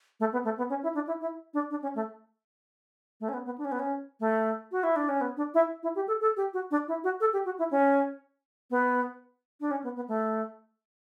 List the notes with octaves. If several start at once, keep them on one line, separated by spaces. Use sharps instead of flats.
A3
B3
A3
B3
C#4
E4
D4
E4
E4
D4
D4
C#4
A3
A3
C#4
B3
B3
D4
C#4
B3
C#4
A3
F#4
E4
D4
C#4
B3
D4
E4
E4
G4
A4
A4
G4
F#4
D4
E4
F#4
A4
G4
F#4
E4
C#4
B3
D4
C#4
B3
B3
A3